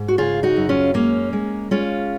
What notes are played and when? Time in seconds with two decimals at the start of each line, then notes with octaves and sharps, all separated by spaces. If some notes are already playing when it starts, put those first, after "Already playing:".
Already playing: G#2
0.08 F#4
0.18 C#3 F4 G#4
0.43 D#4 F#4
0.56 F#2
0.69 C#4 F4
0.94 G#3 A#3 C#4
1.33 G#3
1.71 G#3 C#4 F4